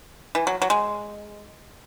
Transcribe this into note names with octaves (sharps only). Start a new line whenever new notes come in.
E3
F#3
F#3
G#3